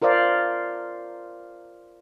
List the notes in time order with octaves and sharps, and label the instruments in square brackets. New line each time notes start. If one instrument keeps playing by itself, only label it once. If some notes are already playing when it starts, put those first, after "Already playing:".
[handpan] F4 A#4 C5 D5 F5